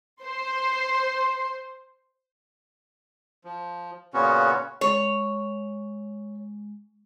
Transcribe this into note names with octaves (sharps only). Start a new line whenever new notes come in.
C5 C6
F3
A#2 C#3 B3 C#4 F#4
G#3 C#5